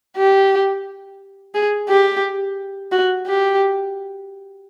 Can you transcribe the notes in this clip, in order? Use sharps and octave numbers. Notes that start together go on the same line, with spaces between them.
G4
G#4
G4
F#4
G4